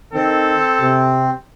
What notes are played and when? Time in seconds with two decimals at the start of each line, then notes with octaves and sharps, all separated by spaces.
0.14 D#3 C4 A4
0.79 C3